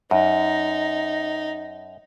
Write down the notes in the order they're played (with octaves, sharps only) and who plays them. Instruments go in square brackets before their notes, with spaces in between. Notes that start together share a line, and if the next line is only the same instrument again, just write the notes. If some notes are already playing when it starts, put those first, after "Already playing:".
[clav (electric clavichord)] F#2 [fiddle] D#4